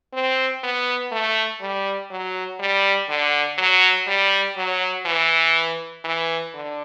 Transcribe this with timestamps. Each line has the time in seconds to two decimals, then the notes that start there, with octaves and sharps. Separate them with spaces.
0.13 C4
0.63 B3
1.12 A3
1.61 G3
2.11 F#3
2.60 G3
3.09 D3
3.58 F#3
4.07 G3
4.57 F#3
5.05 E3
6.04 E3
6.54 D3